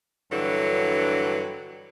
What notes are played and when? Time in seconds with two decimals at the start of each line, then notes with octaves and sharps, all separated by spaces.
0.31 G2 D3 E3 F#3